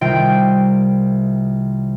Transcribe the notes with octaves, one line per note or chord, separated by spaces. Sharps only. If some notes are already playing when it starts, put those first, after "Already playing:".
C2 C3 D#3 F4 G5 D7